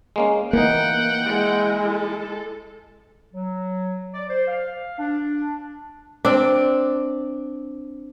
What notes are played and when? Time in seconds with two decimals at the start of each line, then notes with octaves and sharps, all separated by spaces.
0.16 G#3 A#3 C#4
0.53 E3 A#3 D#4 F#5 G5
1.23 G#3 E4
1.85 A4
3.34 F#3
4.14 D5
4.29 C5
4.47 F5
4.99 D4
6.25 C4 D4